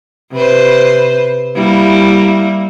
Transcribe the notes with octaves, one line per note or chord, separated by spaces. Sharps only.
C3 B4 C5
G3 A#3 E4